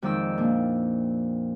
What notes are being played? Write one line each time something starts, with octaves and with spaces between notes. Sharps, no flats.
F2 D#3 G#3 D5 G5 E6
A#2 D4